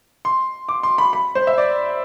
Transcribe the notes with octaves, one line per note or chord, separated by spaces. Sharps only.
C6
D6
C6
B5
B5
C5
E5
D5